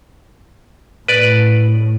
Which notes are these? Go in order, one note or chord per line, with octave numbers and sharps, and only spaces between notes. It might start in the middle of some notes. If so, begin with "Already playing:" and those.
A2 B4 D5